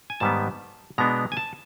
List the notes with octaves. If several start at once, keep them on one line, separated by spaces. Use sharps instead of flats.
G#5
G#2 D#3 G3 B3 A5
B2 G#3 B3 D4 A#5
G#5
A5